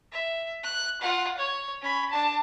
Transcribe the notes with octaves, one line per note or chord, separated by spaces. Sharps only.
E5
F#6
F4 F#5
C#5
C#4 B5
D4 A5